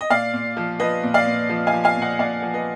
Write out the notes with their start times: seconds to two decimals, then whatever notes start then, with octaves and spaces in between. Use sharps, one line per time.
0.01 D#5
0.10 A#2 D5 F5
0.34 A#2
0.57 F3
0.80 F3 B4 D#5
1.03 A#2
1.14 D5 F5
1.26 A#2
1.49 F3
1.67 F5 G#5
1.73 F3
1.84 F5 G#5
1.96 A#2
2.02 D#5 F#5
2.19 A#2 D5 F5
2.42 F3
2.54 B4 D#5